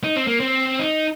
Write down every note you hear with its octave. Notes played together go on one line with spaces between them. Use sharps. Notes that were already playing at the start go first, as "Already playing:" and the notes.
D#4
C4
A#3
C4
D#4